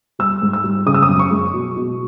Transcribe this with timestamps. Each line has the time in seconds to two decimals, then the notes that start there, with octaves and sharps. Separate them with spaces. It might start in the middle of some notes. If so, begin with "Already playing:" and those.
0.19 G3 E6
0.42 G#2
0.53 E6
0.64 G3
0.86 C#3 D#6
0.94 E6
1.02 D#6
1.09 F#2
1.19 C#6
1.31 G#3
1.54 B2
1.76 B2